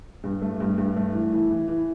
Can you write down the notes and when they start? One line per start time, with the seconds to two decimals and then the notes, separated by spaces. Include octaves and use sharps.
0.24 G2
0.42 A3
0.60 G2
0.78 G2
0.96 A3
1.13 E3
1.33 E3
1.51 E3
1.68 E3